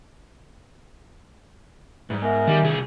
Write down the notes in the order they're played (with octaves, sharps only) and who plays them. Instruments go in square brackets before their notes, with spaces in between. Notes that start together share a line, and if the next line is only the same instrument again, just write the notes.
[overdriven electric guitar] G#2 [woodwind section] E3 G3
[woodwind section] G#3 B3 A#4 [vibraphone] E5 G#5
[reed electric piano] D#3 [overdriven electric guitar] G3
[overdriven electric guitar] C2 G#4